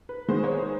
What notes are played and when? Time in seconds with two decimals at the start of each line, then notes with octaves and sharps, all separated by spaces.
0.09 B4
0.28 D#3 G#3 B3 C5
0.44 C#5
0.59 C5